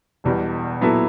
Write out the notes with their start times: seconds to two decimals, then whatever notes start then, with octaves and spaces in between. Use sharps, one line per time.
0.24 E1 E2 B2 G3
0.81 A#2 F#3 B3 E4 A4